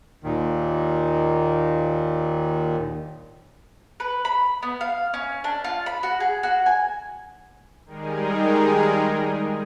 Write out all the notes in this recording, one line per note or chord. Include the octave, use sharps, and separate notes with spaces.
D#2 A#2 D#3
B4
B5
B3
F5
C#4
D4
F4
B5
F#4
G#4
F#4
G#5
D#3 G3 G#3 D#4 G#4 A#4